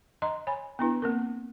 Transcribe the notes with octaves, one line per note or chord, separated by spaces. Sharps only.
D#5 A#5 C6
C#5 G#5 B5
B3 D4 E4 B4
A#3 C4 A#4